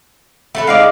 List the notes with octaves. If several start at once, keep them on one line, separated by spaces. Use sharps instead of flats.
A3 A4 B4
G#3 D#4 D5 F5